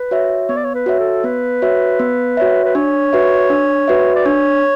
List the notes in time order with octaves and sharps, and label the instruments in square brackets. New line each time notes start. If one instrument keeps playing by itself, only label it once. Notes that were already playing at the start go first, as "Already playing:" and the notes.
Already playing: [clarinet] B4
[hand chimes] F#4 C#5 E5
[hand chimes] B3 [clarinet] C#5
[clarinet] D5
C#5
B4
[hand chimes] F#4 C#5 E5
[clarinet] A4
[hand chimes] B3 [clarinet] B4
[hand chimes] F#4 C#5 E5
B3
F#4 C#5 E5
[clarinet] B4
[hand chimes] D4 [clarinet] C#5
[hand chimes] F#4 B4 E5
D4
F#4 B4 E5
[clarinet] D5
[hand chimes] D4 [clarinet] C#5